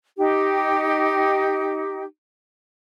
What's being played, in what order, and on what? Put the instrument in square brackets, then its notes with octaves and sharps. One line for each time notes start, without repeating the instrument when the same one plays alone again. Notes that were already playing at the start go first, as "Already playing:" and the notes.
[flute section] D#4 G4